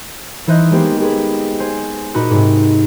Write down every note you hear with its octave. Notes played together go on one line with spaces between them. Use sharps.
E3 D#4 C5 D#5 F#6 G6
G#3 A#3 B3 G4 C5
G4 G#4 B4
C5 G#5
A#2 D#4 F#4 B5 F#6
G#2 C3